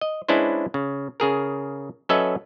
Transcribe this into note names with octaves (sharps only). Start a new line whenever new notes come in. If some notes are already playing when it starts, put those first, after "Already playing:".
D#5
G#3 C#4 D4 E4 B4 C5
C#3
C#3 G#4 A#4
F#3 C#4 A4 B4 D#5 E5